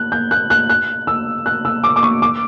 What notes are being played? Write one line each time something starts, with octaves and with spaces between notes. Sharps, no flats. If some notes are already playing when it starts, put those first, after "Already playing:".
Already playing: F#6
G6
F#6
F#6
F#6
E6
F#6
E6
D6
D6
C#6
D6